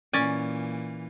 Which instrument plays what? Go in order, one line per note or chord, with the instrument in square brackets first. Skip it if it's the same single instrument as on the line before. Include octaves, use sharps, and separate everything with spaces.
[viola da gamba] A#2 E3 [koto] C#4 D5 G#5